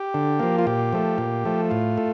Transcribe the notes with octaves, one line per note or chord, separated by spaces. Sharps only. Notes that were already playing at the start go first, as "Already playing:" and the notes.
Already playing: G4
D3
F3 A#3
F4
A#2 G4
F3 A3
A#2
F3 A3
A2 F4
A3